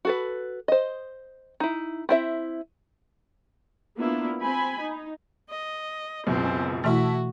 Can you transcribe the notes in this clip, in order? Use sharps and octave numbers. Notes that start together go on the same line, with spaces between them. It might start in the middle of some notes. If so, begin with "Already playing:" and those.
F#4 A4 B4
C5 D#5
D#4 E4
C4 E4 E5
A#3 B3 D4 E4 F4
C4 G#5 B5
D#4
D#5
C#2 F#2 B2 C4
B2 E3 A3 E4 F#4 E5 A5